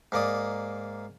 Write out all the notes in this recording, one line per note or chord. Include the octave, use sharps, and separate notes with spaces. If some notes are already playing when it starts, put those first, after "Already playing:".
G#2 A#3 D5 D#6